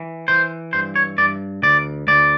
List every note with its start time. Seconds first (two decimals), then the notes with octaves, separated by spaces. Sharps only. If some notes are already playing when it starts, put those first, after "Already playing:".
Already playing: E3
0.28 E3 C5
0.73 G2 C5
0.96 C#5
1.18 G2 D5
1.63 D2 D5
2.08 D2 D5